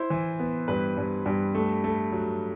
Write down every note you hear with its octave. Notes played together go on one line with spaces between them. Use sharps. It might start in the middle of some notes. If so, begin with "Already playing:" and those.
Already playing: E4 C5
E3
B3
G2 B4
G2
G2
A3
A3
F#3